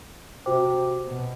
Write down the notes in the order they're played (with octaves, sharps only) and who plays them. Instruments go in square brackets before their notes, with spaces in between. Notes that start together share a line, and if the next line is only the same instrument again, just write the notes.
[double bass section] C3 [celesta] F#4 C5 G5 D6
[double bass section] B2